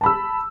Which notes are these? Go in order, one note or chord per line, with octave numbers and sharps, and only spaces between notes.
A5 B5 E6